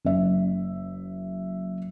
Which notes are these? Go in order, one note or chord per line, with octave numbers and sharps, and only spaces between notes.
F#1 E5